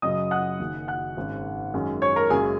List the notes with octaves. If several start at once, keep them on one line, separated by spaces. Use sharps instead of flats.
F#2 C#3 F#3 C#4 D#5 D#6
F#5 F#6
F#1 F#2 D#3
F#5 F#6
G#1 G#2 G#3 C#4
F#2 D#3 G#3 C#4
C#5 C#6
A#4 A#5
F#1 F#2 C#3 G#3 C#4 G#4 G#5